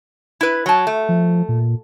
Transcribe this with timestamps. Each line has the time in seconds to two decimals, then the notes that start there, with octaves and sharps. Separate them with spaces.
0.41 E4 B4
0.66 F#3 A5
0.87 A3
1.09 F3
1.49 A#2